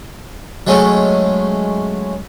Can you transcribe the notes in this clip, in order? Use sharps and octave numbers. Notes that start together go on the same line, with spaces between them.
F#3 G#3 A3 C#4